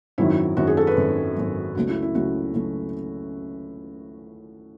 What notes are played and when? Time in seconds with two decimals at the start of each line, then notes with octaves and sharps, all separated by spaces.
0.18 G#1 F#2 D#3 F#3 E4
0.57 G#1 F#2 D#3 F#3 F#4
0.67 G#4
0.77 A4
0.87 B4
0.96 G#1 F#2 D#3 F#3
1.36 G#1 F#2 D#3 F#3
1.75 C#2 C#3 F#3 A3 F#4
1.89 E4
2.02 E4
2.14 C#2 C#3 F#3 A3 F#4
2.54 C#2 C#3 F#3 A3